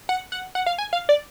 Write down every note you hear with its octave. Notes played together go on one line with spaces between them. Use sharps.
F#5
F#5
F#5
F5
G#5
F5
D5